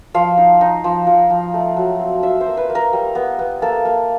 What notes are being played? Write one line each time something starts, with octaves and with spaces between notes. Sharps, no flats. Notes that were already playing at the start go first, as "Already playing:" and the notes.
F3 F5
D#4
D#4
F3
F3
F3
A3
F#3
C4
F4 E5
C5
A#3
B4
A#3
A#4
G3
B3
B3
A#3 A4
A#3